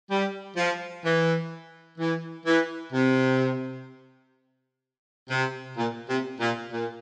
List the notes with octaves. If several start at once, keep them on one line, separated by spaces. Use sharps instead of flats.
G3
F3
E3
E3
E3
C3
C3
A#2
C3
A#2
A#2